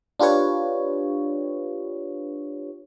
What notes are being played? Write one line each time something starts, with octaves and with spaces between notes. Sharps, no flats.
D4 F4 G4 B4 C#5